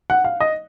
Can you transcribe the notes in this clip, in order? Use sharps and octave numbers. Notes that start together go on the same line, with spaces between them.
F#5
F5
D#5